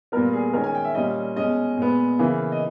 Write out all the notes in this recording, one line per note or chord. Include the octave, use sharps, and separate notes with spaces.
A#2 G3 B3 A#4
G#4
D#3 G#3 C#4 A#4
G#5
G5
E5
A#2 G3 C#4 D#5
B2 G#3 C#4 D#5
A#2 G#3 B3
C#3 E3 A#3
D#5